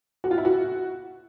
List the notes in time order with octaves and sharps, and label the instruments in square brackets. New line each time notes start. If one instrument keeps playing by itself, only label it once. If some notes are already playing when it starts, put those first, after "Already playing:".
[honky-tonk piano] F#4
F4
E4
F#4